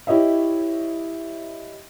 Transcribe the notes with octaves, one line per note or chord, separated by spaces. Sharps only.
E4 G4 C#5 D#5 E5